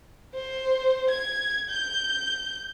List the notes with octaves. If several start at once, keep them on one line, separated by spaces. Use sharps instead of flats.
C5
G#6
G6